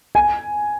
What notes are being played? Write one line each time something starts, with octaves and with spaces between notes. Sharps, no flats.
G#5